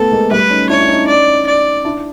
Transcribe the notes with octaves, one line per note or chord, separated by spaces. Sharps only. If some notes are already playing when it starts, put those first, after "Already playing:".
Already playing: A3 B3 A4
G#3 A#3
G3 A3 B4
C#4 D#4
D4 E4 C#5
E4
C#4 D#4
D5
D5
D4 E4